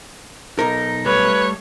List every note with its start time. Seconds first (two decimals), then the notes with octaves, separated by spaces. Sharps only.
0.59 B1 D#4 A#4
1.06 G3 A3 B4 C#5